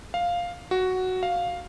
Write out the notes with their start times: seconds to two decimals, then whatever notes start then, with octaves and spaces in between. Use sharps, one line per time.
0.14 F5
0.71 F#4
1.23 F5